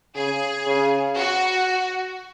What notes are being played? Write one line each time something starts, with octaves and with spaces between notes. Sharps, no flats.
C#3 G#4
C#3
F#4